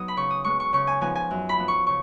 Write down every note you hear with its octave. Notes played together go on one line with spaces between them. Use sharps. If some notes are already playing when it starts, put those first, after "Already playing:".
Already playing: F#3 B3 D#4 D#6
B5
C#3 C#6
D#6
G#3 B3 C#6
C#6
C#3 C#6
G#5
F3 B3 D#4 G#5
G#5
F#2
B5
F3 B3
C#6
C#3 C#6